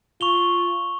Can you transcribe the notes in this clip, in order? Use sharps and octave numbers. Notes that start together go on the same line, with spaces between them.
F4 C#6 F7 G7